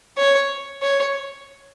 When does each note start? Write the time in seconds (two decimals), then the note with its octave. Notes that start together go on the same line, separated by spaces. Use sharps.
0.17 C#5
0.82 C#5